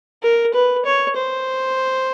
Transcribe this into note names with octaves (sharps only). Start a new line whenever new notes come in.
A#4
B4
C#5
C5